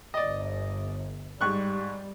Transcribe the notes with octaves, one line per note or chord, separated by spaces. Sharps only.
G1 D5 D#5
G#2 G3 C#6 F#6